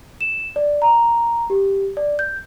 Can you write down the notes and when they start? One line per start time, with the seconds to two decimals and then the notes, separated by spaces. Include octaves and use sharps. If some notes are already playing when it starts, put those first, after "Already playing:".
0.21 E7
0.56 D5
0.82 A#5
1.50 G4
1.97 D5
2.19 G6